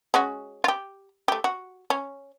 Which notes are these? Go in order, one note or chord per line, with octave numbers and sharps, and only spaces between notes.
G#3 C#4 F#4
F4 G4
A3 G4
F#4
C#4